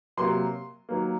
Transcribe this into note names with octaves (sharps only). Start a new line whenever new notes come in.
C3 F#3 A#3 C6
D#3 F#3 A#3